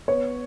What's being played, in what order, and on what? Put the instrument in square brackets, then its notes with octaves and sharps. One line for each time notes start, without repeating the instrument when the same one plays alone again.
[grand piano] B3 C#5